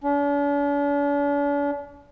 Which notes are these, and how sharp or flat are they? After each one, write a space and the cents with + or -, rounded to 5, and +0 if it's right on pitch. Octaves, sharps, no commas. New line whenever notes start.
D4 -45